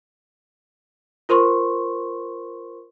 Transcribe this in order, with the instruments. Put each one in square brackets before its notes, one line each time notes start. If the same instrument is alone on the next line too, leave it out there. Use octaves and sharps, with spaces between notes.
[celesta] F4 A#4 C5 C6 C#6